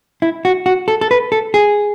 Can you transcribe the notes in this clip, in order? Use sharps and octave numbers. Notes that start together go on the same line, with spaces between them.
E4
F#4
F#4
A4
A4
B4
A4
G#4